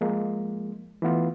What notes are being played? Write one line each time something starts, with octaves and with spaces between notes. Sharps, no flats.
F3 G#3 A#3
E3 A3 B3 F4